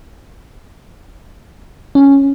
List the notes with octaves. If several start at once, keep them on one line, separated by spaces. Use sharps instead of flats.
C#4